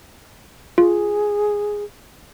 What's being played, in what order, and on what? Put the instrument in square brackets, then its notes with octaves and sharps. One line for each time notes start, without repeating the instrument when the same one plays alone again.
[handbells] F4 [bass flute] G#4